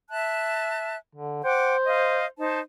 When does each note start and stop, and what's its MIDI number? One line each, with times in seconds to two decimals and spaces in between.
0.10 0.96 76
0.10 0.96 81
0.10 0.96 90
1.15 1.42 50
1.44 2.25 72
1.44 1.75 78
1.44 1.75 79
1.44 1.75 86
1.85 2.25 75
1.85 2.25 77
2.38 2.60 63
2.38 2.60 72
2.38 2.60 81